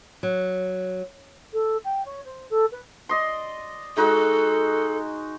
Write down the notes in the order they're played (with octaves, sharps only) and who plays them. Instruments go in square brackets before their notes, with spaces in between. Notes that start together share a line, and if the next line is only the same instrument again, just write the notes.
[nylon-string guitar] F#3
[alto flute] A4
G5
C#5
C5
A4
B4
[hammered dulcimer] D5 D#5 C6
[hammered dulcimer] G#3 D#4 F#4 [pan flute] A4